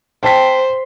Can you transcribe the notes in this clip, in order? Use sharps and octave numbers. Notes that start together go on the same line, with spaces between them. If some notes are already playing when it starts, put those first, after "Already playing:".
C5 G5 A5 B6